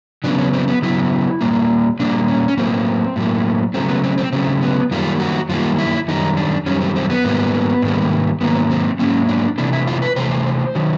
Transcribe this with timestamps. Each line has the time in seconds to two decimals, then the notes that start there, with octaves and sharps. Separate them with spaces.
0.24 C#3 F#3 B3 D4
0.38 C#4
0.54 C4
0.68 B3
0.82 C#3 F#3 B3 E4
1.41 A#2 G3 A#3
2.00 A#2 G3 A#3 D4
2.28 C#4
2.48 C#4
2.57 A2 F#3 A#3 C4
3.16 A2 F#3 A#3
3.74 C#3 F#3 A3 C4
3.88 B3
4.04 C4
4.18 C4
4.32 C#3 F#3 A3 C4
4.62 B3
4.91 F#2 D#3 G3 A#3 F4
5.20 F#4
5.49 F#2 D#3 G3 A#3 F4
5.78 E4
6.08 F#2 D#3 G3 D#4
6.37 D4
6.66 F#2 D#3 G3 C#4
6.81 C4
6.96 C4
7.10 B3
7.24 G#2 D#3 G3 A#3
7.82 G#2 D#3 G3 A#3
8.41 G#2 D#3 F#3 A#3 B3
8.70 C4
8.99 G#2 D#3 F#3 A#3 C#4
9.28 D4
9.58 C3 E3 A3 D4
9.73 E4
9.87 F4
10.02 B4
10.16 C3 E3 A3 C5
10.75 D#3 F#3